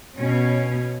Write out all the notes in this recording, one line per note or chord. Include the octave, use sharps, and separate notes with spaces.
B2 C#4